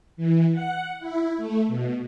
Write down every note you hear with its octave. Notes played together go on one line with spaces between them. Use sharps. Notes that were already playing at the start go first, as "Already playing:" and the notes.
E3
F#5
E4
A3
B2